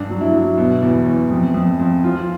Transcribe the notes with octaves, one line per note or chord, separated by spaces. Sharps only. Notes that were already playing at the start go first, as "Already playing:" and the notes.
Already playing: G2 D4
F#3
E4
F#3
B2
E2
E2
F2
F2
F2
F3 F4